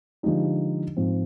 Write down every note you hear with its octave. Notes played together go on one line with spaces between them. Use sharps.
D3 F3 G#3 D#4 G4
G#2 F3 C4